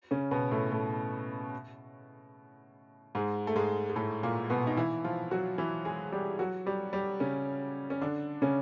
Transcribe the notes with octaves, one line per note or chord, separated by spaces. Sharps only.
C#3 C#4
B2 B3
A2 A3
A2 A3
G#2 G#3
A3
G#2 G#3
G#3
A2 A3
A#2 A#3
B2 B3
D#4
E3 E4
F3 F4
F#3 F#4
E3 E4
G#3 G#4
G3 G4
F#3 F#4
G3 G4
G3 G4
C#3 C#4
C#4
D3 D4
C#3 C#4